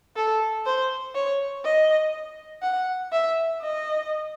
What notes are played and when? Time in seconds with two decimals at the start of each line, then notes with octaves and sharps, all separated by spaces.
0.16 A4
0.66 C5
1.15 C#5
1.64 D#5
2.62 F#5
3.12 E5
3.61 D#5